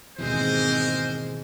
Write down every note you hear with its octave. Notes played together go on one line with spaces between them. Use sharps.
D#2 G#2 B2 E3 G#3 C4 A#4 C5